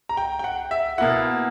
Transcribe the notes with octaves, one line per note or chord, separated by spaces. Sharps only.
A#5
G5
G5
F#5
E5
B2 A#3 E4 F#5